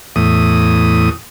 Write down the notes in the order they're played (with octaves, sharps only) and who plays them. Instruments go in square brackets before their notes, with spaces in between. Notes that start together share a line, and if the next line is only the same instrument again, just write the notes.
[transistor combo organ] E2 A2 D#6